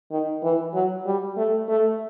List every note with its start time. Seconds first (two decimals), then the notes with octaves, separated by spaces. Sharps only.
0.11 D#3
0.43 E3
0.74 F#3
1.06 G3
1.37 A3
1.68 A3